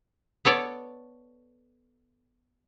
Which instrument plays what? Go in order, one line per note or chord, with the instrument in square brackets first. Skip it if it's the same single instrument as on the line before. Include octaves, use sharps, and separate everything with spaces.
[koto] B3 A4 C#5 D5